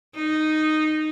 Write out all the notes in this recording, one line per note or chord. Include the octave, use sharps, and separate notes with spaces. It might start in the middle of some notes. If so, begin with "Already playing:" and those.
D#4